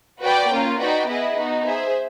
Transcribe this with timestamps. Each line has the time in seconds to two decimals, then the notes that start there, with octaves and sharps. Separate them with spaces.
0.21 F#4 B4 D5 G5
0.50 A#3 C#4 F4
0.79 D#4 F#4 B4 D5 G5
1.07 B3 E4 G#4 B4 D#5
1.36 B3 D#4 F#4
1.65 G#4 C5 E5